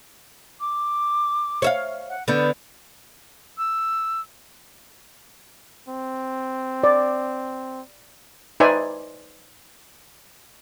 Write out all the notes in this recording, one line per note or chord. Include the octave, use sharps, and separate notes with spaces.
D6
C#5 E5 F5
F#5
D3 B3 G6
E6
C4
D5
D#4 B4 C5 D5 E5 G#5